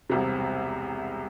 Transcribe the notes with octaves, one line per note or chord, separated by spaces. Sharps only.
E1 C2 C3